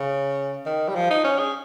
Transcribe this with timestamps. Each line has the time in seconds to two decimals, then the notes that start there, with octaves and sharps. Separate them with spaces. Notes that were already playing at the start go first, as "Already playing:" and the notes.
Already playing: C#3
0.66 D#3
0.88 G3
0.95 F3
1.10 D#4
1.24 C#4
1.39 G#4